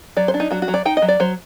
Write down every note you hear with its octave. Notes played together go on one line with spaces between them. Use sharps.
F#3 D5
C5
D4
D#4
F#3 F#4
F#4
F#3
D5
D#4 G5
D#5
F#3
D5
F#3 C5